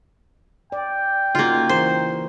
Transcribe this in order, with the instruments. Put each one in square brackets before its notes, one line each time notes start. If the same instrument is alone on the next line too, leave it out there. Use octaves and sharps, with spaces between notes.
[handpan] D5 [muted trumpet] G5
[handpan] C#3 D#4 F#4 [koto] A#3 F4
[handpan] E3 A#4 [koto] C5